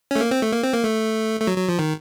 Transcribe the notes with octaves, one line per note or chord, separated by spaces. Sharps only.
C#4
A3
A#3
C4
A3
A#3
C4
A#3
A3
A3
F#3
F#3
F3
D#3